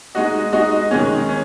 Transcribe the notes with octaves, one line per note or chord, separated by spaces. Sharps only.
G#3 D#4 F#4 D#5
G#3 D#4 F#4 D#5
D#3 G#3 C#4
C#4